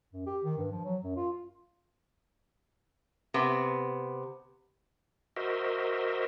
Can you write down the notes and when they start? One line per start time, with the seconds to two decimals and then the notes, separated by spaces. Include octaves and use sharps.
0.13 F#2
0.27 G4
0.44 D#3
0.58 G2
0.72 F3
0.84 F#3
1.04 F#2
1.16 F4
3.34 C3 B3
5.36 F#4 A#4 C5 D#5 E5